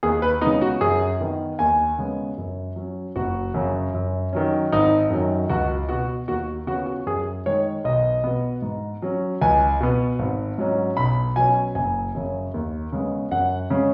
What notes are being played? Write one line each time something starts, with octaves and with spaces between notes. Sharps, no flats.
D#2 G#4
B4
C#3 G#3 B3 D#4
F#4
F#2 G#4
D#3 B3
D#2 G#5
C#3 G#3 B3
F#2
F#3 C#4
F#1 F#4
F#2 C#3
F#2
D#3 F#3 C#4
G#1 D#4
F#2 D#3 F#3
C#2 F#4
B2 B3 F#4
D#2 F#4
C#3 B3 F#4
F#4
F#2 G#4
D#3 G#3 C#5
B1 D#5
B2 B3
G#2
F#3 C#4
C#2 G#5
B2 B3
G#1
G#2 F#3 C#4
B1 B5
B2 F#3 C#4 G#5
F#1 G#5
F#2 C#3
D#2
C#3 G#3 B3
F#2 F#5
C#3 G#3 C#4